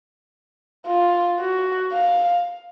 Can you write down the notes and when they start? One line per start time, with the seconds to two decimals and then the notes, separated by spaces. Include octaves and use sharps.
0.87 F4
1.40 F#4
1.93 F5